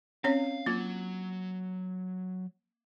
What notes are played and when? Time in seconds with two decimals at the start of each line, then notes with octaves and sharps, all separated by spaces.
0.24 C4 C#4 C#5 F5
0.66 F#3 A#3 F4